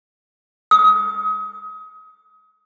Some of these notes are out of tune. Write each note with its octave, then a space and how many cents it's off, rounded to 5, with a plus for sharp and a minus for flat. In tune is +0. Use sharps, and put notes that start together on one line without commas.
D#6 +30